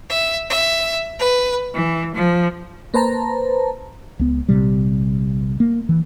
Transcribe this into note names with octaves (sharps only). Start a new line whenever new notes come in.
E5
E5
B4
E3
F3
A#3 B4 C5 A5 A#5
C#2 B3
A#1 C3 G3
A#3
E3